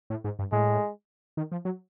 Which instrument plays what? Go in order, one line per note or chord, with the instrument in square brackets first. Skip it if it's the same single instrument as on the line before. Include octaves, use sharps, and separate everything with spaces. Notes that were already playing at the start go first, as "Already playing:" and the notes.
[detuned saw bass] A2
G#2
G2
[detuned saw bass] A2 [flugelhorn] G#3
[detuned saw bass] D#3
F3
F#3